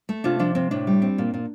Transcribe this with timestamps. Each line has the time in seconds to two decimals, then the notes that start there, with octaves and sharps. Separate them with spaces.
0.09 A3
0.24 C3 D4 F4
0.39 F3 D4
0.55 C3 C4
0.71 A2 D4
0.87 G3
1.02 C4
1.18 A#2
1.34 A#2